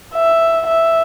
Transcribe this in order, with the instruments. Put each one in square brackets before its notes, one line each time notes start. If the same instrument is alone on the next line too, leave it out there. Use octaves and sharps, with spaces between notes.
[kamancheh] E5
E5